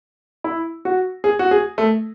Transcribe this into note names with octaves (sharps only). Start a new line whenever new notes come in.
E4
F#4
G#4
F#4
G#4
A3